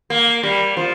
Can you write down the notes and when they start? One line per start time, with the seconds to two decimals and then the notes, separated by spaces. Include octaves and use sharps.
0.10 A#3
0.43 G3
0.77 F3